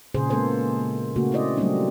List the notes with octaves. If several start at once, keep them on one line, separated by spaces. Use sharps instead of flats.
A#2 C#3 G#4 C5
G#3 A#3 B3 A4 C5
C#3 A3 A#3 F#4
C4 C#4 E4 C5 D5 D#5
F#3 G3 A3 A#3 C4 D4